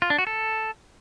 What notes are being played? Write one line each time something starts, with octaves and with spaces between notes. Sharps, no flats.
F4
D4
F#4
A4